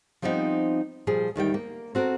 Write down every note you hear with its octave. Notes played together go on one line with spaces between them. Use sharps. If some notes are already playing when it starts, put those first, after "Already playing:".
F3 G3 B3 C4 D#4
A#2 F3 G3 G#4
D2 D#3 G3 G5
A#3
C4 F#4 A4 A#4